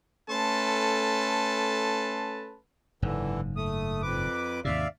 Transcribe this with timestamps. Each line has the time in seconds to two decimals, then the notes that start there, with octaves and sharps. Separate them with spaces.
0.30 A3 C#4 A4 B4 A5 C6
3.02 F#1 G#2 D3 E3
3.56 A3 D#6
4.02 F2 B4 D6
4.65 D#2 G#2 C3 D5 E5 F5